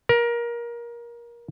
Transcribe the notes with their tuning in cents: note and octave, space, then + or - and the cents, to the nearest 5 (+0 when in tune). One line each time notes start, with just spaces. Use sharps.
A#4 +20